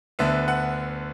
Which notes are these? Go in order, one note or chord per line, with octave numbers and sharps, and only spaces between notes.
D2 D3 B3 E5
F#5